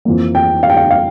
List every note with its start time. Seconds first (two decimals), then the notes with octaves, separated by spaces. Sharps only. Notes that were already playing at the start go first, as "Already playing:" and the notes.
0.05 F2 E3 A#3
0.35 G5
0.63 F5
0.70 G5
0.77 F5
0.91 F5